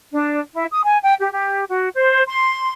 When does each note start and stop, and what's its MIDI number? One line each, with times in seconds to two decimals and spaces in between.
0.12 0.38 62
0.52 0.64 64
0.71 0.81 87
0.84 0.98 80
1.02 1.13 79
1.19 1.30 67
1.31 1.63 67
1.68 1.89 66
1.95 2.21 72
2.27 2.72 84